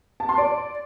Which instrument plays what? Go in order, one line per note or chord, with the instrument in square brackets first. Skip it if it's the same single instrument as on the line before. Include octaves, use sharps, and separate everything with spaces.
[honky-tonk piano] A5
C6
D5